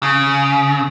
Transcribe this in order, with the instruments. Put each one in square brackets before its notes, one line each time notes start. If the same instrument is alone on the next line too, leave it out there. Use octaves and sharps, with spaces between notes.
[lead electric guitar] C#3